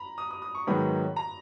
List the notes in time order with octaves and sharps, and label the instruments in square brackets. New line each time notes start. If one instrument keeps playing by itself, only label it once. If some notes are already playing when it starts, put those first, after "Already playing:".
Already playing: [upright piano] A#5 B5
D#6
D#6
D#6
C#6
[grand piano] G#2 D#3 F#3 B3 [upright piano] B5
[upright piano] A#5